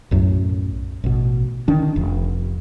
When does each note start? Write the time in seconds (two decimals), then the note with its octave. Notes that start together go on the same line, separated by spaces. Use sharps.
0.11 B1 F#2 A2 F#3
1.04 A1 B2
1.68 D3 D#3 C#4 D4
1.96 F1